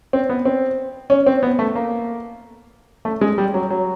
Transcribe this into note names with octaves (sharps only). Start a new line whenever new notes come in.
C4
B3
C4
C#4
C4
B3
A3
A#3
A3
G#3
G3
F#3
F#3